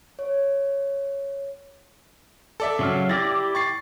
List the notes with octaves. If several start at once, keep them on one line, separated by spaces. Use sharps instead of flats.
C#5
A4 D5 E5
C#3 F#3 F5
E4 G4 D5 A6 A#6
C#6 A6 C7